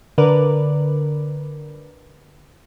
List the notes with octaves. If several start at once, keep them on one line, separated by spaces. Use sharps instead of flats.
D3 A#4 B4 D5